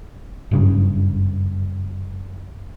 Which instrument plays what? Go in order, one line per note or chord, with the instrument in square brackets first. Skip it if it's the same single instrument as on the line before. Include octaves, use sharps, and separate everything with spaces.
[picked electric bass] F#1 G2 C#3